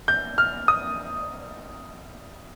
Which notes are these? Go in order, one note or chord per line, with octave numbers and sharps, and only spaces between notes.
G6
F6
D#6